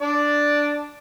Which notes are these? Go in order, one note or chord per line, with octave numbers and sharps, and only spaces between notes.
D4 D5